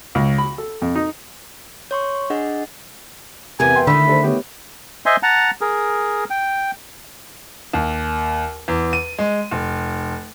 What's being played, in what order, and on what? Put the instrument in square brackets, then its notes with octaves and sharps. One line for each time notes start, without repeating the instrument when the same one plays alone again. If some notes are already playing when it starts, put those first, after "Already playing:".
[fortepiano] C#2
B5
A4
F2
D#4
[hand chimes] C#5 C6 C#6
D4 G#4 D#5 F#5
[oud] E2 B3 A#4 [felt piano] C3 [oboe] G#5
[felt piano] E5 G5 C6
[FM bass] D3 [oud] D#3 A3 [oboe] B5 [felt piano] E6
[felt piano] D4 A4 C5
B3 G4 C#5
[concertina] C5 D#5 E5 G#5 C6
F#5 A5 A#5
G#4 A#4
G5
[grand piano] D#2
E2
D#7
G#3
F1